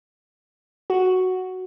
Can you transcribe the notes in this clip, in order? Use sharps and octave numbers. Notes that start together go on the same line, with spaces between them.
F#4